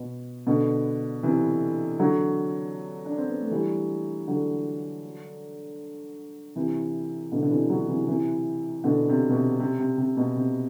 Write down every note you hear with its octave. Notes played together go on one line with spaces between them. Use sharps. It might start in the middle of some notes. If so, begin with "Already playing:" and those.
Already playing: B2
B2 D3
C3 E3
D3 F#3
D4
C4
B3
A3
E3 G3
D3 F#3
C3 E3
B2 D3
D3
C3 E3
D3 F#3
C3 E3
C3 E3
B2 D3
C3
B2
C3
C3
C3
C3
B2
C3